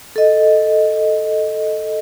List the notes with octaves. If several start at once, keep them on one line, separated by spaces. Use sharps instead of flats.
A4 D#5